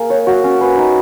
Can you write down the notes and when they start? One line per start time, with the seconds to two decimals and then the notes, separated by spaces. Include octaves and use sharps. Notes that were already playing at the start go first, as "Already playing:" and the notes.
Already playing: A#3 G#4
0.10 C#5
0.27 F#4
0.44 C#4
0.61 B4
0.77 D#4